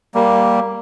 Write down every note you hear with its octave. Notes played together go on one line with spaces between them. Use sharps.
G3 A#3